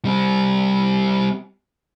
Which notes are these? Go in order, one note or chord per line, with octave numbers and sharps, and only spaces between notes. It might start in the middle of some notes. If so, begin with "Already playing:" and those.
G3 C4